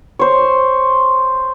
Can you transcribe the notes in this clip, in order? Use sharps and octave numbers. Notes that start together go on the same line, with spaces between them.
C5 C#5